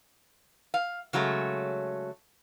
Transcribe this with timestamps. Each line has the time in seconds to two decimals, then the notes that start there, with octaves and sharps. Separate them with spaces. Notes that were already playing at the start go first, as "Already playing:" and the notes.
0.74 F5
1.13 C#3 F#3 G#3 A3